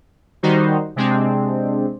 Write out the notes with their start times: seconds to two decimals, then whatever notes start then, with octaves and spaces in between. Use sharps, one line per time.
0.43 D#3 G3 D#4 F#4 C5
0.96 C3 G#3 C4 D4